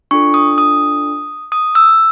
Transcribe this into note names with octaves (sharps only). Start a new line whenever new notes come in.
D4 F4 A4 C#6
D#6
D#6
D#6
E6